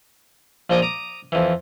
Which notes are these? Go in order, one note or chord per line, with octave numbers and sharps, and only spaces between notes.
A#1 F3 D#5 G#5 D6 D#6
A#5 D6 D#6
F2 E3